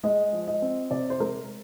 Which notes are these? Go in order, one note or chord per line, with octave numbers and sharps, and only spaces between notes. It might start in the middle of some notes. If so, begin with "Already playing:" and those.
G#3 D#5
F3
D#5
C4
C3 D5
C5
G#3 A#4